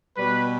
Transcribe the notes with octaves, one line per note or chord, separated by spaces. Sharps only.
B2 G3 B4